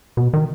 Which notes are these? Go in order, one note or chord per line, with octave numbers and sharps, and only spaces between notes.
B2
D#3